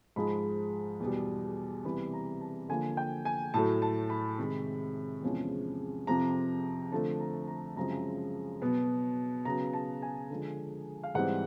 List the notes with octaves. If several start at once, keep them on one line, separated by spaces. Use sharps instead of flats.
G#2 F3 G#3 B5
E2 B2 G3
C3 E3 G3 B3 B5
A#5
A5
D3 F3 A#3 G#5
G5
G#5
A2 F#3 A3 A5
A5
B5
C3 D#3 G#3
E2 C3 F3 G#3 C#4
F2 C3 F3 A#5
D3 F3 A3 C4 A5
A#5
A#5
F#2 C#3 F3 G#3 C4 A#5
B2 F#3 B3
C#3 F#3 B3 A#5
A5
G#5
D3 F3 G#3
F5
G#2 E3 G3 C4 F#5